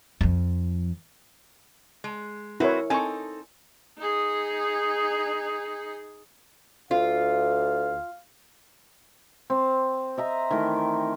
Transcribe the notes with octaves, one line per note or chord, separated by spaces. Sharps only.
F2 F3
G#3
C4 E4 F#4 A#4 B4 C#5
C4 D#4 A4 G#5 C#6
D#4 G#4
D2 F4 F5
C4
D#5 E5 A#5
D#3 E3 A3 A#4